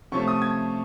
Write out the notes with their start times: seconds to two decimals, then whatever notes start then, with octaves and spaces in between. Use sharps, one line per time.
0.12 C3 F3 A3 C#4 C#6
0.28 D#6
0.42 G#6